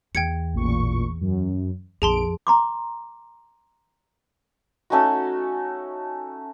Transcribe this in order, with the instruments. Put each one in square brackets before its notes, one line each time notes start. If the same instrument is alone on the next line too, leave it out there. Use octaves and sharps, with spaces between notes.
[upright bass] E2 [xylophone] G5 G#6 C#7
[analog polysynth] A1 A#2 C#6
F#2
[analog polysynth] A#1 D7 [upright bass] F2 [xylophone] G#4 A5 C6
[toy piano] A#5 C6 D6
[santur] A3 C#4 D#4 F#4